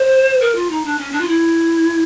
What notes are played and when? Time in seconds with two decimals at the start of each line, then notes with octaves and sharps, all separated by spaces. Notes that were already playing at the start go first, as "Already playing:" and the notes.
Already playing: C5
0.40 A#4
0.54 F4
0.70 D#4
0.84 D4
0.98 C#4
1.12 D4
1.20 F4
1.27 E4